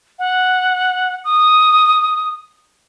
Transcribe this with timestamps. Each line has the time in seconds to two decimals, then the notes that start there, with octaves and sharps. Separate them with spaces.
0.19 F#5
1.24 D#6